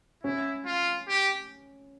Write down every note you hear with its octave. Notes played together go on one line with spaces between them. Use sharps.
C#4 E4
F4
G4